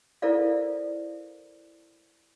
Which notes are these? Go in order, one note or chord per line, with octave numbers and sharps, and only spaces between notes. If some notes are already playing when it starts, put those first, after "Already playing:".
E4 A4 A#4 C5 D5 F5